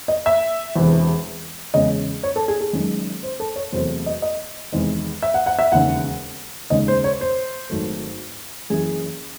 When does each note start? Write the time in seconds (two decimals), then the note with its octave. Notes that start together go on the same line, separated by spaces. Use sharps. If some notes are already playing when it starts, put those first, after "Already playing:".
0.08 D#5
0.26 E5
0.76 E1 E2 C3 E3
1.74 E2 C#3 G#3 C#4 D#5
2.23 C#5
2.36 A4
2.48 G#4
2.61 G#4
2.73 F#1 F#2 D#3 G#3
3.23 C5
3.40 A4
3.56 C#5
3.72 E2 C3 F#3 A3 C4 C5
4.06 D#5
4.22 D#5
4.73 E2 C3 D#3 G#3 C4
5.23 E5
5.34 F#5
5.46 F#5
5.59 E5
5.72 E1 D#2 C#3 F#5
6.70 D#2 C#3 G#3 D#5
6.88 C5
7.04 C#5
7.21 C5
7.70 G#1 G#2 F#3 A3
8.70 F#1 F#2 E3 G#4